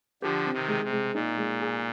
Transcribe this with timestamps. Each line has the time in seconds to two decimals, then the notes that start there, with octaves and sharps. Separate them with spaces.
0.22 D3 F3 G4
0.46 C4
0.53 C3 D#3
0.68 G#3
0.84 C3
0.92 G#3
1.14 A#2 D#4
1.37 G#3
1.60 G#4